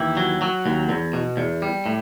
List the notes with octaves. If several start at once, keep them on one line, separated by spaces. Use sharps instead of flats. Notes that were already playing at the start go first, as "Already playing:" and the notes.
Already playing: D#2 E3 E4 G4
F#3
F#3
D#2
E2
B2
E2
G3
A2